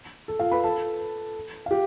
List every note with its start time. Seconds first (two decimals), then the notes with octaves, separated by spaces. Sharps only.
0.28 A4
0.39 F4 F5
0.52 B4 B5
0.64 A4 A5
1.66 F5
1.71 G4